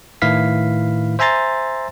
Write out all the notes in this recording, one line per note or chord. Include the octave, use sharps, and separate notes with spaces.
A2 D#3 E4 B4 F5 B6
C5 E5 G#5 A#5 C6 A6